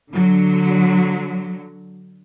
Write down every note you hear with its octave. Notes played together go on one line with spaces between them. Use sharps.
D3 F#3